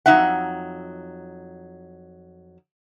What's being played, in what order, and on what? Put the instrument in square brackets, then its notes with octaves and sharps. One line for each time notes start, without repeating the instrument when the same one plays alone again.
[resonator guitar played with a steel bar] F2 F#3 D#4 E5 F#5